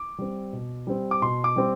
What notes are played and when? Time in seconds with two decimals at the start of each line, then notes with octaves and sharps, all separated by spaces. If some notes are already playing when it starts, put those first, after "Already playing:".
Already playing: D6
0.18 G3 C4
0.53 B2
0.87 G3 C4
1.11 D6
1.22 B2 C6
1.44 D6
1.56 G3 C4